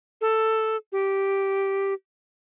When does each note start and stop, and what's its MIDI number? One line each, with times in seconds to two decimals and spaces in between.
0.21 0.77 69
0.92 1.94 67